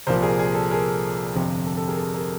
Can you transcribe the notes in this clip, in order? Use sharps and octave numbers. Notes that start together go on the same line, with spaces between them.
C2 A#2 F3 A#4 C5
G#4 A#4
G#4
A4
G#4 A#4
G1 F2 C3
A4
A4
G#4 A#4
A4
G#4 A#4